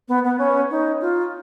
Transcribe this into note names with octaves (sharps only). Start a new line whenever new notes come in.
B3
B3
C#4
D#4
F4